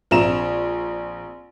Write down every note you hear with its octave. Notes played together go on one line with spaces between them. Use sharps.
A#1 C4 A#5 E7